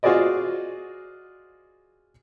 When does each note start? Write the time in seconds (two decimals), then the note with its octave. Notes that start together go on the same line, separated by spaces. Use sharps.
0.03 F4 F#4 G#4 C5 D5 D#5